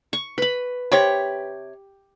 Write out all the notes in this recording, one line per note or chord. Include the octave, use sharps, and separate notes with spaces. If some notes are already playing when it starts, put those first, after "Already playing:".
C#6
B4 B5
C3 G4 C#5 B5